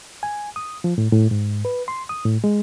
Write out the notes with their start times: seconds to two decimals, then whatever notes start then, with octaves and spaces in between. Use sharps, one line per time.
0.23 G#5
0.56 D#6
0.84 F3
0.98 A2
1.12 A2
1.31 G#2
1.65 B4
1.88 C6
2.09 D#6
2.25 A2
2.44 G#3